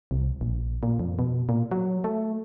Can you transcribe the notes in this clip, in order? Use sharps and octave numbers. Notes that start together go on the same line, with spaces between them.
C2
A#1
A#2
F2
B2
A#2
F#3
A3